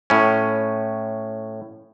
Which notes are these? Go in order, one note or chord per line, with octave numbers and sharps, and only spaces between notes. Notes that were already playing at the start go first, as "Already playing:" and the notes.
A2 C#4